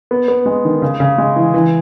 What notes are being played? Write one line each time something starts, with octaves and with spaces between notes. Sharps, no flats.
B3
B3
G#3
D#3
C#3
C#3
G#3
E3
E3